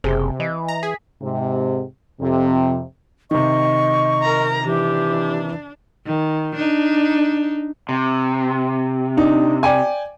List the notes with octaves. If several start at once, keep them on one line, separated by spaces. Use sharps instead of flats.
F#1 C3 G#4 C5
E3 D#5
A#5
G#4 B6
G#2 C3
F2 C3
C3 D#3 D#5 C#6
A#4 A#5
E3 D4 G4
D#3
D4 D#4
C3
D4 D#4
D5 G5 G#5